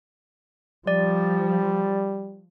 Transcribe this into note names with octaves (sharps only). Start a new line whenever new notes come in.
F3 G3 D5